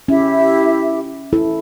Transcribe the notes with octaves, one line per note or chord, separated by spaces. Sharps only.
C#4 E4 G4 E5
E4 A4